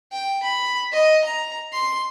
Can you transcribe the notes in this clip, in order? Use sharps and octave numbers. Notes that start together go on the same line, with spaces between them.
G5
B5
D#5
A#5
C6